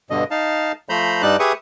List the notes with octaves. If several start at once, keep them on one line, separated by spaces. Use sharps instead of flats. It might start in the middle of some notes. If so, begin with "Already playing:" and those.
G2 B2 D3 D#5
D#4 F5 A5
F3 A3 C5 A#5 B5 G6
G2 G3 D#4 D5 A5 F#6
G4 G#4 B4 E5 C#6 D#6